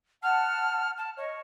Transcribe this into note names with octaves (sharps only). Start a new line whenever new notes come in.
F#5 A5 F6
A5
C#5 D#5